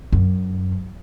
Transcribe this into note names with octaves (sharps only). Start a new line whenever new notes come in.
F#2